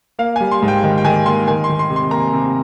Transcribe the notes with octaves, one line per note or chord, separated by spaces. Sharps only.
A#3 F5
G3 G#5
C6
G#2
G5
D#3
G5
D#3 G#5
A#3 C6
D#3 G#5
C6
D#3
C6
C3
C6
A#3 A#5
C3